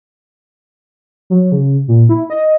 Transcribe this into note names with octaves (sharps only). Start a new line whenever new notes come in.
F#3
C#3
A#2
E4
D#5